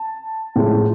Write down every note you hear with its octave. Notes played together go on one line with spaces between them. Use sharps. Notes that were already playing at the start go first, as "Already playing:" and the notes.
Already playing: A5
A2 F3 G#3